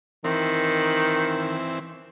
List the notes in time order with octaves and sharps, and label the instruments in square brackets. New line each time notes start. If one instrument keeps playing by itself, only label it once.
[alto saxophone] D#3 [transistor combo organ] E3 C4